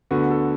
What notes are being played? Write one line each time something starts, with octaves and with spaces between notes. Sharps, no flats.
D2 D3 B3 F#4
A4